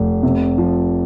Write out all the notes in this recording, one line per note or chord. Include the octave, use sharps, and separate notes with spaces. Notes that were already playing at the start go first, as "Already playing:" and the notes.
Already playing: F1
C3
F3